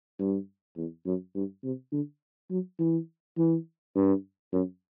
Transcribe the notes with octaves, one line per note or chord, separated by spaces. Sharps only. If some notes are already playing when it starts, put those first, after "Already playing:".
G2
E2
F#2
G2
C3
D3
F#3
E3
E3
G2
F#2